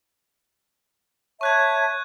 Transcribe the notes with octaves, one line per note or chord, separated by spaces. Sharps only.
C#5 E5 A5 C#6 F#6 G#6